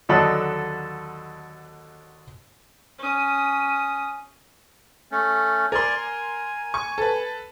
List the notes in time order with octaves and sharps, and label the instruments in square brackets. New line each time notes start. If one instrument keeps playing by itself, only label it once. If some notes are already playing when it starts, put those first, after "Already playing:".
[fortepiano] D#2 D3 F#3 A4 D#5 B5
[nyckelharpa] C#4 D#6
[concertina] A3 C#4
[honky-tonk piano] A#4 C6 [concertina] D5 G#5
[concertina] G#5
[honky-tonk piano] C#6
A4 B4